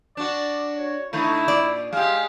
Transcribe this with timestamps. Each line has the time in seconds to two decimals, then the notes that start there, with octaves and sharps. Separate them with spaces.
0.17 D4 F#4 D5
0.75 C#5
1.13 D3 A3 D#4 E4
1.48 A#2 D5
1.93 G#3 G4 F5